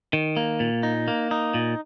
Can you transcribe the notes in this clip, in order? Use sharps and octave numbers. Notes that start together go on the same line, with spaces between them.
D#3
A#3
A#2
D#4
A#3
D#4
A#2